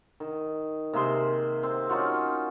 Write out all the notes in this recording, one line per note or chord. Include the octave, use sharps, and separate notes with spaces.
D#3
C3 A#3 G#4 C6
C4
C#4 D#4 F4 F#4